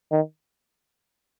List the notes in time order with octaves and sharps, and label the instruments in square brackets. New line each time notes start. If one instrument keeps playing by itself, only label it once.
[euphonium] D#3